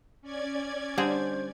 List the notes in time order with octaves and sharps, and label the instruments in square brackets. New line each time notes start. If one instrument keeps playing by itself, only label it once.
[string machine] C#4 D5 G#6
[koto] D3 C4 G#4 [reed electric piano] G3 D4 [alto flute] C5